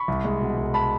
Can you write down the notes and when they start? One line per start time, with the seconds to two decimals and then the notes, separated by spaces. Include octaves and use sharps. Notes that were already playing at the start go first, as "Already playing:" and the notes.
Already playing: B5 C#6
0.08 C2
0.24 G#3
0.41 B2
0.57 C2
0.74 A5 B5